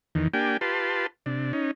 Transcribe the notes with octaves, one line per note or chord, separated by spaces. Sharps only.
E2 D#3
A#3 D4 G4 G5 G#5
F4 G4 B4 A5 C6
C3 D4
C#4 D#4